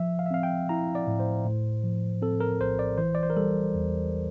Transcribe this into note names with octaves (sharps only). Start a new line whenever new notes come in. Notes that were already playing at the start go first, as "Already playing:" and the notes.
Already playing: F3 E5
F5
E5
C4 F5
G5
E4 A#5
D5
A2
C5
A2
F3
C4 A4
A#4
A#1 C5
D5
E3 C5
D5
C5
A#4
G3 A4
E2